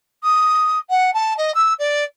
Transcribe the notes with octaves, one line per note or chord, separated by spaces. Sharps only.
D#6
F#5
A5
D#5
E6
D5